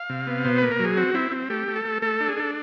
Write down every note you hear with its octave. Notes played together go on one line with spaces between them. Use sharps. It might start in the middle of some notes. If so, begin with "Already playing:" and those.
Already playing: F5
C3
B3
B2 C5
A#3 B4
A#4
F#3 G#4
C4 F#4
C4 E4
C4
A3 G4
A3
A4
A3
A3 A4
D4
G#4
D4 A4